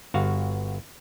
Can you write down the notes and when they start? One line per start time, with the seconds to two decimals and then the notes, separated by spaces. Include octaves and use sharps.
0.14 G1 F#4 F5